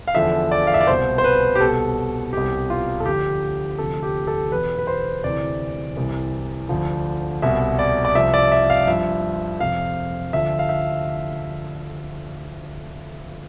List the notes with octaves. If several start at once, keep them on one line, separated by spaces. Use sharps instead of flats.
F5
E2 D3 F3 E5
D5
F5
E5
D5
C2 B2 C5
C5
B4
G4
C2 B2 A4
C2 B2 G4
F4
A4
D2 D3 F3 G4
D2 C3 F3 A4
G4
A4
E2 B2 B4
B4
C5
D2 C3 E3 D5
C2 C3 E3
D2 D3 F3
C2 B2 E5
D5
D5
C2 C3 F3 E5
D5
E5
F5
G2 F3 E5
F2 C3 F3 F5
D2 D3 F3 E5
F5
E5